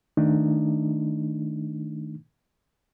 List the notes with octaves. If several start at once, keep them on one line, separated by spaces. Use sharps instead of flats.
D#3 A3 D4 D#4